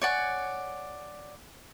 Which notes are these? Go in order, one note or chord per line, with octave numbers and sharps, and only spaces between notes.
C#5 D5 F#5 G#5